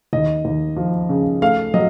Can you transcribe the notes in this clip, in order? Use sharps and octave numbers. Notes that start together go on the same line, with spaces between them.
D#2 D#5
D#2
F3
C#3
A3 F5
F#3 D#5